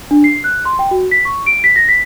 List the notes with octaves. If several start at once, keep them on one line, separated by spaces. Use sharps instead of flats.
D4
C7
F#6
C6
G5
F#4
B6
C#6
D7
B6
A#6
B6